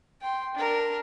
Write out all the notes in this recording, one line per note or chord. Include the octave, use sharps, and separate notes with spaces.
G5 C6
D4 A#4